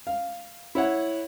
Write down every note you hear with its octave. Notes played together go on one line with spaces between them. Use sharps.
F5
E4 C#5 F#5